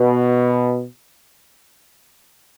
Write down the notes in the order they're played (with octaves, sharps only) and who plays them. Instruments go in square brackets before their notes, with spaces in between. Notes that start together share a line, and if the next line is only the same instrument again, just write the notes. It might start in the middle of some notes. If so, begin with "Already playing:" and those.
Already playing: [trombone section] B2